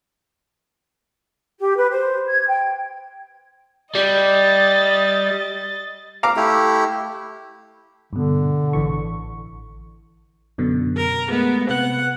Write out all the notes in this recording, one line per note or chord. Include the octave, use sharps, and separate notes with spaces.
G4
B4
C5
G#6
G5
G3 D#5 A6
F5 A#5 D6
A3 E4 G4
G2 B2 D3
A1 E3 C#6
F#2 B2 D3
A#4
G#3 A3 B3
C3 B3 F#5 F#6